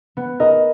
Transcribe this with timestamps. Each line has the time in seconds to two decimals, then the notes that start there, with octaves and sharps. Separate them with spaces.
0.17 B3
0.40 A#4 D#5